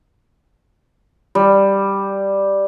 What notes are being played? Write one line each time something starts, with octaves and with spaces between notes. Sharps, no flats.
G3